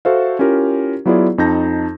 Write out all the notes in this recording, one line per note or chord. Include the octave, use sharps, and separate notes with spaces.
F#4 A4 C5 E5 F5
C#4 E4 F4 G4 A#4
F#3 B3 E4 F4 G#4 D5
F2 D#4 A5 G6 A#6